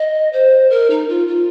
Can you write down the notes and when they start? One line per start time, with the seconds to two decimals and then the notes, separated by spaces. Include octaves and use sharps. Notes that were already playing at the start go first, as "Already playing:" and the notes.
Already playing: D#5
0.33 C5
0.70 A#4
0.90 D#4
1.09 F4
1.28 F4